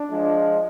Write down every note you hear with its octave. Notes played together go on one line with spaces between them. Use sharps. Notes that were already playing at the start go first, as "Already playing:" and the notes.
Already playing: D4
F3 G#3